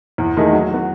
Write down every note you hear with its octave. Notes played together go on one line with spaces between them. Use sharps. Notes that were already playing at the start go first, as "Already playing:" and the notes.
E2
D#3 A3 D#4 G#4
F#3
B3 F#4